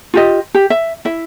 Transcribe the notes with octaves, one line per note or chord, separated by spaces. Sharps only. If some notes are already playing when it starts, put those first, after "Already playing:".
F4 G4 D#5
G4
E5
E4 E5